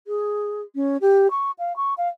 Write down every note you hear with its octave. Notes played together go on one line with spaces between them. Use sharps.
G#4
C#4
G4
C#6
F5
C#6
F5